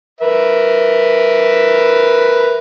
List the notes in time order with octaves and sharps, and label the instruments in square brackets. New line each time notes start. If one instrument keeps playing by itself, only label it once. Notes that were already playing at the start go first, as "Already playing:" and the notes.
[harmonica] A#4 B4 E5